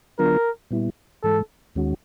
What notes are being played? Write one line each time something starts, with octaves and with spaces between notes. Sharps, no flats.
D3 F#3 B3 D4 F4 A#4
A#2 G3 B3 E4
G#2 E3 G#3 A4
D#2 D#3 G#3 C#4 F#4